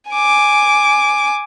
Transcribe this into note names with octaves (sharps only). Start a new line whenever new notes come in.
G#5 D6